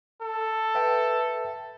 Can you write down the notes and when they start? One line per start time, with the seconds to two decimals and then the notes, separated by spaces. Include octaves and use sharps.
0.22 A4
0.75 B4 E5 G5